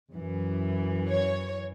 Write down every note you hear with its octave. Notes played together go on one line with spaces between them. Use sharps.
F#2 E3
C#5